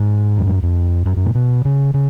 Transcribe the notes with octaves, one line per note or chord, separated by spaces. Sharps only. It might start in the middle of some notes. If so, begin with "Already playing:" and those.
Already playing: G#2
F2
F#2
F2
F#2
F#2
A#2
B2
C#3
C#3